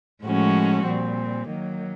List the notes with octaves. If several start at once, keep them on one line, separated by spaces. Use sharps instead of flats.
A2 F3 G#3 C#4 F#4
A#2 G3 C4
D#3 F#3 A#3